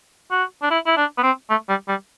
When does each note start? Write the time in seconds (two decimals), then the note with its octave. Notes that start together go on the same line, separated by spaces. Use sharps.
0.31 F#4
0.62 D4
0.70 E4
0.86 E4
0.97 D4
1.17 B3
1.23 C4
1.50 A3
1.69 G3
1.88 G3